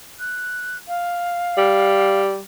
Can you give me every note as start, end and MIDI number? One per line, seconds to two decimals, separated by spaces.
0.19 0.77 90
0.88 2.20 77
1.58 2.40 55